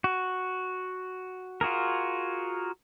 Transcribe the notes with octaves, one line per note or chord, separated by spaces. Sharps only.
F#4
F4 F#4 G#4 A#4